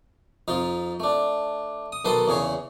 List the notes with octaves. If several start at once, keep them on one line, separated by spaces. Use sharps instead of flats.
F2 D#4 F4
A3 D4
D#6
B1 D#3 A4 B4 C6 D#6
E2 C#3 G#4 C#5